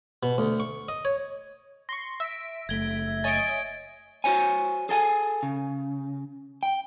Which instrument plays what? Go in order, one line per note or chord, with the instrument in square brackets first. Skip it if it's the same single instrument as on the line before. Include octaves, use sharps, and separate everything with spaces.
[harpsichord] B2
D2
C#6
D#5
C#5
[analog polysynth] C6 C#6 [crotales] A#6
[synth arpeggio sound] E5 [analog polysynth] B6 D7
[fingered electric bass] F#1 A3 [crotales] G#6 G7
[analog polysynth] C#5 D#5 G#5 [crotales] A6 D7
[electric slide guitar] F#4 C5 C#5 G#5
G#4 A4 G5 G#5
C#3
G5